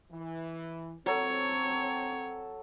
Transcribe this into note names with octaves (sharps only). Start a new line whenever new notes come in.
E3
F#3 C4 A4 C#5